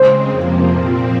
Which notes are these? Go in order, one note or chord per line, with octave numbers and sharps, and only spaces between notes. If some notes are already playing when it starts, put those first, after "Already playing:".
Already playing: C#3 G#3 C4 C5
F2 C3 F3 A#3
A#2 F3 C4